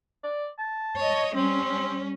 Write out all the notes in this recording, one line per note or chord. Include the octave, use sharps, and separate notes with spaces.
D5
A5
C#5 D#5
G3 C4 C#4